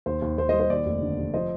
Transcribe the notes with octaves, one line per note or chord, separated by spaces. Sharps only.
D#2 C5
D#2
D#2 C5
G3 C5 D#5
C5
D#2 D5
F1
D3
F1
F3 C5 D#5